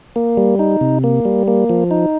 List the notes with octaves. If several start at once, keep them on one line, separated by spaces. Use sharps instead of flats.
A#3
G3
D#4
C3
A#3
G3
A#3
F3
D#4